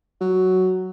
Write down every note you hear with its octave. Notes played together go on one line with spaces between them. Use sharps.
F#3